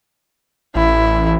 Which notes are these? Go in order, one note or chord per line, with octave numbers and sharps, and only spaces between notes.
A1 E4